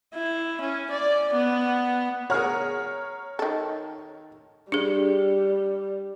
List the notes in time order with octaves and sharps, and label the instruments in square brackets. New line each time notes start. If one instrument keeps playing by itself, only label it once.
[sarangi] E4
C#4
D5
B3
[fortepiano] G#4 A#4 F#5 [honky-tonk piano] C#5 A#5 F6
[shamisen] D#3 A4
[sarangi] G3 [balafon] D4 G#4